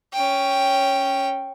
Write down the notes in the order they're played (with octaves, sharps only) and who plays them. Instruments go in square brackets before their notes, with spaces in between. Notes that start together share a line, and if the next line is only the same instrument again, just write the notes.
[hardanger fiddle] C#4 G5